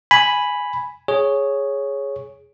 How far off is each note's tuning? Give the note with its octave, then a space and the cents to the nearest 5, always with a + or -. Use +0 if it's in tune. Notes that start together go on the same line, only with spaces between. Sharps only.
G#5 +0 B5 +0
G#4 +0 C#5 +0